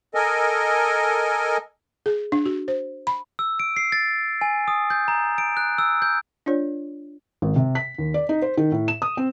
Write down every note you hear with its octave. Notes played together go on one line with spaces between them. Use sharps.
A4 A#4 D#5 G#5
G#4
D4
F#4
C5
B5
E6
D7
C7
A6
G#5
D#6
G6
A#5
D7
F#6
E6
G6
D4 F4 C#5 D5
G#1
C3
B6
D#2
D5
D#4
C5
D#3
A2
E7
D#6
C4